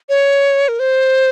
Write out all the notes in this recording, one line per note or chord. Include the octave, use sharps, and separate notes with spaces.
C#5
A#4
C5